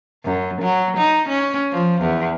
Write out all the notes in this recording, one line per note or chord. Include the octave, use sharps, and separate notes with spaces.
F#2
F#3
D#4
C#4
F3
E2